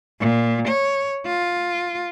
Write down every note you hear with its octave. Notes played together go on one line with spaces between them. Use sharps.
A#2
C#5
F4